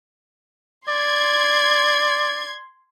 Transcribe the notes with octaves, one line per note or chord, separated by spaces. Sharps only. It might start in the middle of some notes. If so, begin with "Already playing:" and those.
D5 C6 G#6